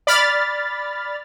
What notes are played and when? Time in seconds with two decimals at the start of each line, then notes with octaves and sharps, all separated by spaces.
0.07 D5 B5 F6 A6